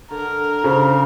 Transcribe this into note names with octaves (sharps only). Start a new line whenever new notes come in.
D3 A#4
C#3 C5